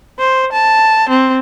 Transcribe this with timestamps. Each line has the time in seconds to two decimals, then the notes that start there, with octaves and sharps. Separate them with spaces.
0.19 C5
0.52 A5
1.09 C4